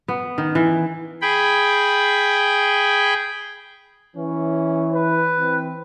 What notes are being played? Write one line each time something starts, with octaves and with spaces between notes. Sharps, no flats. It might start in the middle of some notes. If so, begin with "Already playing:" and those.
B3
D#3
E3
G#4 G5 B5
E3 C#4
B4
E3 C4